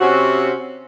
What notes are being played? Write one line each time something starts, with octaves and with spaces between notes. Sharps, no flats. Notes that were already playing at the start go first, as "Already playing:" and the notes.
C3 C4 C#4 F#4